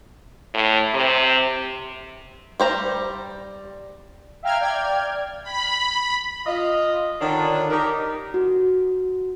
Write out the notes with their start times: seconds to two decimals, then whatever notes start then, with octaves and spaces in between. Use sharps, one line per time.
0.54 A2
0.94 C3
2.60 G3 C5 A#5
4.43 E5 F5 G5 A#5 F6 G#6
4.60 D5 G5 F6 G#6
5.43 B5
6.46 F4 D#5
7.20 D3 D#3 D4 F4 A4 C#5
7.70 D#4 G4 A#4
8.34 F#4